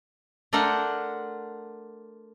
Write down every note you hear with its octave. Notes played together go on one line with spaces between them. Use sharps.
A3 D4 A#4 C5 F#5